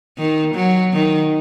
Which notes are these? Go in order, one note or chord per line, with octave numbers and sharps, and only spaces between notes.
D#3
F#3
D#3